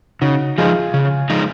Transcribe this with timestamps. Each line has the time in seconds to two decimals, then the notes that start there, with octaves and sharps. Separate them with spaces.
0.21 C#3 D#4 F#4
0.58 F3 G#3 D#4 F4 G#4
0.94 C#3
1.30 F3 G#3 D#4